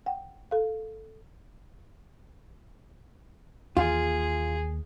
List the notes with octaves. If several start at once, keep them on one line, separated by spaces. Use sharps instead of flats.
F#5 G5
A4 F5
D#2 E3 A#3 F4 G#4